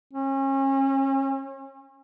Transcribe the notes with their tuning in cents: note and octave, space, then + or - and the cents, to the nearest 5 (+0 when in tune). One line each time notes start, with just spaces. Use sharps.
C#4 -35